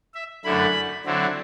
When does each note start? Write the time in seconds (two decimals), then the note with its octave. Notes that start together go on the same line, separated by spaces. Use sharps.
0.15 E5
0.44 F#2 D3 A3 E4 B5
1.05 D3 F#3 C4 E4